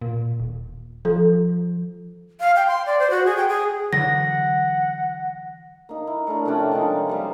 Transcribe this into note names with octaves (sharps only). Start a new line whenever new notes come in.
A#2
D#1
F3 A4
F5
G5
C6
D5
C5
F#4
G#4
G5
G#4
D3 E3 F#3 F#5 A#6
A#3 D#4
E4
A2 D4 A#4
C3 F3 C#4 D4
F3 G#3 D#4
G3 A#3 G4